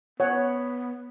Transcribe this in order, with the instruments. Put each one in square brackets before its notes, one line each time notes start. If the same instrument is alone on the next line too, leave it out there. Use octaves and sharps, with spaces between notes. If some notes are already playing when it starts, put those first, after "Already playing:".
[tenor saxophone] B3 [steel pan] C#5 F#5